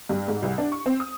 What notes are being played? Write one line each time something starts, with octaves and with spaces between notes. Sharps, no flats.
G2
G#2
C2
D4
C#6
C4
D#6